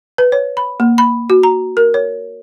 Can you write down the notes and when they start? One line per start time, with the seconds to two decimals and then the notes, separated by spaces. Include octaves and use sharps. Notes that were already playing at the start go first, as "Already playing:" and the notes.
0.18 B4
0.32 C#5
0.57 B5
0.80 A#3
0.98 B5
1.30 F#4
1.43 A#5
1.77 A#4
1.94 C#5